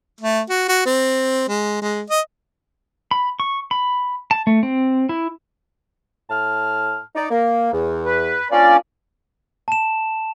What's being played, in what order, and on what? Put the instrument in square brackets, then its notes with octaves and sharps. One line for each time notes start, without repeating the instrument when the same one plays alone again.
[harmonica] A3
F#4
F#4
C4
G#3
G#3
D#5
[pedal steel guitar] B5
C#6
B5
A5
A3
C4
E4
[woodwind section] A2 A5 F6
D#4 D5
A#3
E2
[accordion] B4
[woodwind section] A#3 D4 F4 [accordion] C#4 D5
[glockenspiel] A5 E7